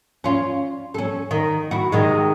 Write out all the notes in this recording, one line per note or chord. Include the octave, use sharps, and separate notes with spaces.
C#4 F4
C#4 A4
D#3
E4 F#4
C3 D#3 G#3